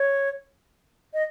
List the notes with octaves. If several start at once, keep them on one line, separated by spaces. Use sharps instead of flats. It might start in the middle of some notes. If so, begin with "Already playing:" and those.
Already playing: C#5
D#5